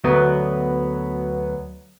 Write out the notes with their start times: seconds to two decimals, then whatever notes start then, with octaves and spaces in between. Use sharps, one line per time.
0.04 D2 F#3 B3